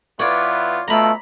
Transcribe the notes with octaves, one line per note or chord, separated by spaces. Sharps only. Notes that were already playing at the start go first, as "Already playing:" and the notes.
E3 B3 F4 C#5 D5
B2 A3 F4 A#5 B5